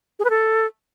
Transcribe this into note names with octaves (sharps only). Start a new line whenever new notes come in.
G#4
B4
A4